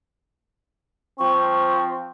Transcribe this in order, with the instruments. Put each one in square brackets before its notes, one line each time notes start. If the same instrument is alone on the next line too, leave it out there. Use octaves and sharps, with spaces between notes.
[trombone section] F3 C4 [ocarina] C#6